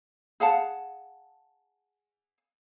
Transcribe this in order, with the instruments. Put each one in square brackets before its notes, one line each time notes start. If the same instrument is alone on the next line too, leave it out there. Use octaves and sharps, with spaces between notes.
[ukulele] G#4 F5 F#5 A5